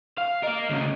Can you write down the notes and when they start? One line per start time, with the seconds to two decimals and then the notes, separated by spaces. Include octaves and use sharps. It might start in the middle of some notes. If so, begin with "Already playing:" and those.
0.18 F5
0.43 A#4 D#5 F5
0.70 D2 C#3